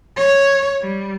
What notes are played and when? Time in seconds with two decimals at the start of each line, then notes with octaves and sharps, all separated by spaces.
0.16 C#5
0.82 G3